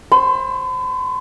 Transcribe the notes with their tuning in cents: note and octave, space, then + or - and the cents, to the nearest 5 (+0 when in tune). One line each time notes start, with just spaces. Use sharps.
C5 +20 B5 +45